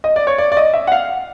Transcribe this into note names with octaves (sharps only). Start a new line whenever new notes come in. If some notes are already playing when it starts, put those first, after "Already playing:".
D#5
D5
C#5
D5
D5
D#5
E5
F#5
F5